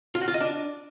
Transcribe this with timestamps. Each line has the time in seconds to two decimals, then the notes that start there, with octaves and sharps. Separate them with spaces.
0.15 F4
0.21 F#4
0.28 F4
0.34 D#5
0.40 D4